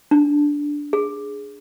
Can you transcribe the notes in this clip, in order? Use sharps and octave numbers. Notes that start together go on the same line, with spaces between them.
D4
G#4